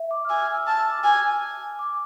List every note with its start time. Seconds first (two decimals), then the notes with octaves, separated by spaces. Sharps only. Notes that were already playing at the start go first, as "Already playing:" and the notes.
Already playing: E5
0.11 D6
0.25 F6
0.29 G#5 E6
0.41 F6
0.54 E6
0.67 A5 F6
0.79 E6
0.91 D6
1.04 G#5
1.79 D6